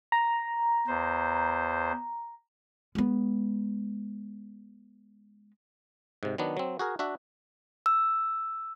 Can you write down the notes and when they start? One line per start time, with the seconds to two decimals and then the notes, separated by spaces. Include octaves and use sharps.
0.12 A#5
0.87 E2 C5
2.95 G#3 B3
6.23 G#2 C3
6.38 D#3 F#3 B3 D4
6.57 F#3 C4
6.79 F#4 G#4 A#4
6.99 D4 F#4 E5
7.86 E6